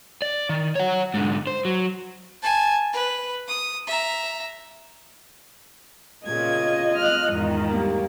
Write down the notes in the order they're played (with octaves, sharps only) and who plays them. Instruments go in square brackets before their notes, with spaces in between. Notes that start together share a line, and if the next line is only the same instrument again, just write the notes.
[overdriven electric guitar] D5
D#3
C#5 F#5
G#2 D3
C5
F#3
[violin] G#5 A5
B4
D#6
E5 A#5
[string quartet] A#2 C#3 G#6 [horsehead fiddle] F4 D#5
[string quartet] F6 F#6
E2 G#2 D#3
[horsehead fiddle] G3 A#3